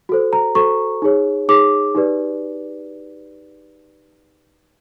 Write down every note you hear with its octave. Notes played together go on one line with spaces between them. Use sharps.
F#4 A4 C5
A#5
F#4 A4 C5 C#6
D#4 G#4 C#5
D#4 G#4 C#5 D6
D#4 G4 B4 D5